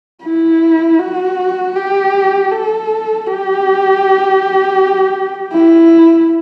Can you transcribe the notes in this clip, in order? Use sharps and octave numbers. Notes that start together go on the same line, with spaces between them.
E4
F#4
G4
A4
G4
E4